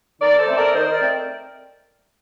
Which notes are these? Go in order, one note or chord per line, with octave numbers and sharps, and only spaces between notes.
D#3 A#4 D5
A4 C5
A3 C4
A#4 D5
D#3 C5 D#5
A#4 D5
A3 C4